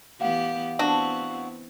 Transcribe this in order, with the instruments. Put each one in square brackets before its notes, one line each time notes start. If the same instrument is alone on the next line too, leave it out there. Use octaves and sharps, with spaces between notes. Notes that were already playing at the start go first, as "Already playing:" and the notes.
[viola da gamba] E3 B3 G4 [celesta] F5 F#5
[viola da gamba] B3 C4 E4 [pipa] D4 F#4